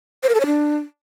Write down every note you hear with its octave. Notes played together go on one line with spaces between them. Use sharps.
C5
A#4
A4
C#5
D4